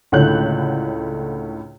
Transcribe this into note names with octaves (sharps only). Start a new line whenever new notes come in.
C#2 A2 D3 C#5 F#6 G6